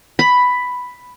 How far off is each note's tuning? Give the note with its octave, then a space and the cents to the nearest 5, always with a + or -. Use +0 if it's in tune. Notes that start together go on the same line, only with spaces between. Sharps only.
B5 +5